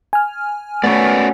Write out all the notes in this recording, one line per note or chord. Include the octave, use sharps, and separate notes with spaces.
G#5 F6
A3 B3 C#4 F#4 B4 D5